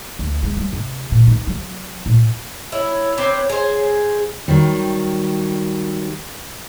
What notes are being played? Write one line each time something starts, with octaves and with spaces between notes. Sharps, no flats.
D2
G#3
G3
C3
A#2
D#4
F#3
A#2
E4 C#5
C4 D4 B4
G#4 C5
D#3 F#3 G3